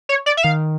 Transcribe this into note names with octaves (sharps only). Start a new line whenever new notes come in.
C#5
D5
E5
D#3 F5